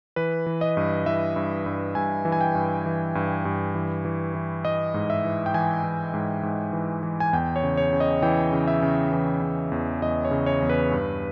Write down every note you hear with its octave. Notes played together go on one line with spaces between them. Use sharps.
E3 B4
E3
D#5
G2
E3 E5
G2
G2
G2 G#5
E3
G#5
G5
G2
E3
G2
G2
E3
E3
E3
E3 D#5
G#2
E5
E3
G5
E3 G#5
E3
G#2
G#2
E3
E3
G#5
E2 G5
C#5
C#3
C#5
C#3
D#5
E3 G5
C#3
E5
C#3
E3
C#3
E2
E2 D#5
C#5
C#3
C#5
E2
B4
G2